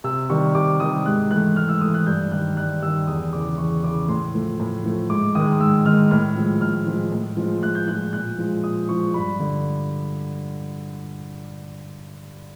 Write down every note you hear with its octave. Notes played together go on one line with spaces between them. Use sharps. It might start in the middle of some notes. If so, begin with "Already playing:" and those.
C3 E6
D#3 G3 C#6
C3 D6
D#3 G3 D#6
G#2 F#6
E3 A3 F#6
G#2 F6
E6
E3 A3 D#6
F#6
G2 G6
D#3 G3 F#6
G2 F#6
D#3 G3 E6
E2 D#6
C#3 E3 D6
E2 C#6
C#3 E3 D6
A2 C6
F3 A3
A2
F3 A3
G#2 D6
D#3 G#3 D#6
G#2 E6
D#3 G#3 F6
A2 F6
F3 G#3
A2 F6
F3 G#3
A2
F3 G#3
A2 F#6
G6
F3 G#3 F#6
A#2 F#6
F3 G#3
A#2 D#6
F3 G#3 C#6
G2 B5
D3